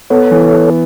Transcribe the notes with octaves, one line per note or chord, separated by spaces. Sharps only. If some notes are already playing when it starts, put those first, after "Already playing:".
B3 A4 C#5
E3